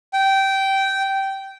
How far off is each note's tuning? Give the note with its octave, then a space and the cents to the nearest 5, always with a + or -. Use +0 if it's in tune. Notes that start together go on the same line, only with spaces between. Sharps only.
G5 -15